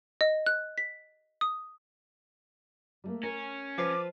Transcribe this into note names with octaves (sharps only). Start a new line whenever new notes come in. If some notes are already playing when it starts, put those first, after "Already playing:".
D#5
F#6
B6
D#6
G3 A3 A#3
C#4 A#4
F3 B4 F5 D6